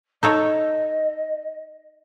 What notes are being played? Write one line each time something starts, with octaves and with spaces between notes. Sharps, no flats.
D#4 A4 C#5 D#5